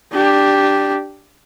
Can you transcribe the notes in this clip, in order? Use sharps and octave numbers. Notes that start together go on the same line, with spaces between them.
D4 G4